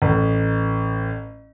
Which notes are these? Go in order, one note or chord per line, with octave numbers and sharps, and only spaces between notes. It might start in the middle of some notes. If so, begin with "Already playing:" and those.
A1